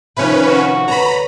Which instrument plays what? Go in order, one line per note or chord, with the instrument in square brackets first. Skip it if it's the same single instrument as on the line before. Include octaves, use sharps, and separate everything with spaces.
[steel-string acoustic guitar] C3 D#3 F3 [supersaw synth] C#4 B4
[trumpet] F#4
[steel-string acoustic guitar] D2 B4 C#5 [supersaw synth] A#5 B5